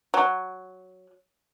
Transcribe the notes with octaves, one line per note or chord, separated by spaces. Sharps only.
F#3